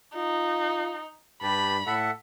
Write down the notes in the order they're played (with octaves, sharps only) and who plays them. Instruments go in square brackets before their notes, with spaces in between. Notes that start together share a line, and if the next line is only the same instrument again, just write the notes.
[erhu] D#4 [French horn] F4
[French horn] G2 [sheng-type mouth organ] G4 B4 A5 [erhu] B5
[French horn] A2 [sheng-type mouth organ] A4 E5 F#5